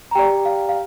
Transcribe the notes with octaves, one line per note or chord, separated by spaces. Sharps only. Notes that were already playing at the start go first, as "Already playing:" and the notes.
A#5
G4 D5 G5
F5
F5